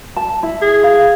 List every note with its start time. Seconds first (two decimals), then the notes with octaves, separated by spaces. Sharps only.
0.16 A5
0.43 E4
0.62 G#4
0.83 F5